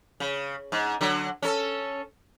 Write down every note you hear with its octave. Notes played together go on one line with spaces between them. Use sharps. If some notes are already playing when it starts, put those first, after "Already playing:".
C#3
G#2
D3 F#3
C#4 A4